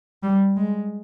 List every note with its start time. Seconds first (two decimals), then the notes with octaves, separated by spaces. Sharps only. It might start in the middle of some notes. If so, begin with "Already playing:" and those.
0.23 G3
0.57 G#3